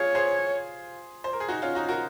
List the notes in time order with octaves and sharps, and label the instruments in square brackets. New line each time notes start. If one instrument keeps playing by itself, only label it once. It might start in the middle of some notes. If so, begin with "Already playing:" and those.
Already playing: [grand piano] F4 G#4 [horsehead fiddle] C#5
[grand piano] G#4 C5
C5
A#4
G#4
D#4 F#4
C#4 F4
D#4 F#4
F#4 A#4